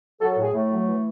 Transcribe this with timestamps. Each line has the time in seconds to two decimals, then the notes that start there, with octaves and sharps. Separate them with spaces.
0.21 F#3 A4
0.32 A4
0.37 A2
0.42 G#4
0.53 A2 A3
0.70 F#3
0.87 E3